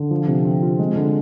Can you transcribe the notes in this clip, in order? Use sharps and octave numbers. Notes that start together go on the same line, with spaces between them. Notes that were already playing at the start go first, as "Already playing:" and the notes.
Already playing: D3
F3
C3
C4
F4
G#3
D3